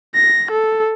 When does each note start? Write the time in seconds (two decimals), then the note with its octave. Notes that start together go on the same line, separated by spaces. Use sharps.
0.15 A#6
0.51 A4